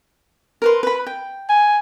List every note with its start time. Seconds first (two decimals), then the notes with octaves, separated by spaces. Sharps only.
0.62 A#4 B4 C6
0.83 B4 B5
1.07 G5
1.49 G#5